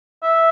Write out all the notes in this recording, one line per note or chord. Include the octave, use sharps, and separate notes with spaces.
E5